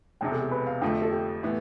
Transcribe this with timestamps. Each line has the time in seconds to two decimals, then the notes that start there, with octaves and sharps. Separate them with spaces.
0.21 E1 E2 C3 G5
0.32 A4
0.41 G4
0.51 B4
0.67 F5
0.81 F2 D3 F3 A3 G5
1.02 A4
1.12 G4
1.43 A2 E3 B3